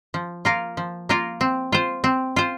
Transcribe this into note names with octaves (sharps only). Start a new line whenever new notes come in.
F3
A#3 F4 A#4 F5
F3
A#3 F4 A#4 F5
C4
F4 C5
C4
F4 C5